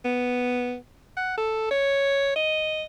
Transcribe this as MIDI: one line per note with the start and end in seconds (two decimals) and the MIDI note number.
0.05 0.76 59
1.17 1.38 78
1.38 1.68 69
1.71 2.34 73
2.36 2.84 75